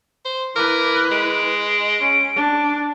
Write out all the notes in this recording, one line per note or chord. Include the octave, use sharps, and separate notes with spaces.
C5
E4 A#4 B4 D6
G#3 D7
C#4
D4